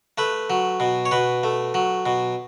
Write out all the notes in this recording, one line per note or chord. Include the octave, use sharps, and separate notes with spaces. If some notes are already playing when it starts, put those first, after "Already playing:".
A3 B4
F#3
B2
C#5
B2 B4
A3
F#3
B2